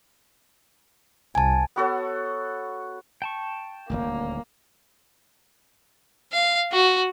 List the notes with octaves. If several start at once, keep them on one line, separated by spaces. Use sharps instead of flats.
C2 G#5 A5
B3 F#4 A4 C#5
G5 A5 C#6
D#1 G#1 D2 A#3
F5
F#4